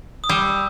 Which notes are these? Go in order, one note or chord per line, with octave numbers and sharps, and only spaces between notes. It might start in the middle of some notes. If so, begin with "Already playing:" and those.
D#6
G3 E6